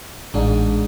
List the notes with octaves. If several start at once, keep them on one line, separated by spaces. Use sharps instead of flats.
A1 G#2 D4